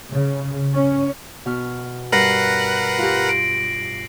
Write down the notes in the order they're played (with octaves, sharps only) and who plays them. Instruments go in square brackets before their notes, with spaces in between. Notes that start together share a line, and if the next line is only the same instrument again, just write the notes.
[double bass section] C#3
C#4
[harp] B2 F6
[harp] G2 [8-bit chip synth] A#4 B4 F#5 [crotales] A#6 C7 F#7
[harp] F4 G4
[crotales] D7